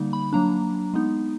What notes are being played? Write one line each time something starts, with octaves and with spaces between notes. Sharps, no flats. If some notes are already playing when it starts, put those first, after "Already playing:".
Already playing: D3 G3 A#3 D#4
B5
F#3 A#3 D4 A#5
G#3 B3 D#4